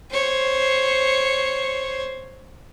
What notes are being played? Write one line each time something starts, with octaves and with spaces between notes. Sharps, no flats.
C5 C#5